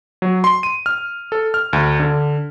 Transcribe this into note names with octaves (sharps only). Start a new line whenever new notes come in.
F#3
C6
D#7
F6
A4
F6
D2
D3